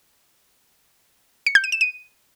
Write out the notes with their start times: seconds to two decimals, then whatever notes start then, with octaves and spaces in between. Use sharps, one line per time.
1.47 C#7
1.55 G6
1.64 D#7
1.72 E7
1.81 D#7